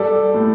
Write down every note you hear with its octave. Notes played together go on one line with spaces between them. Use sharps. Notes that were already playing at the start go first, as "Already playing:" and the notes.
Already playing: G3 A4 D5
A2